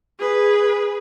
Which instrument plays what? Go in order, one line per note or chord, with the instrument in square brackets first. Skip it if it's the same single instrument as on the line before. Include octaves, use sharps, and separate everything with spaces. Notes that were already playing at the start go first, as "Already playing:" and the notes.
[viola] G#4 B4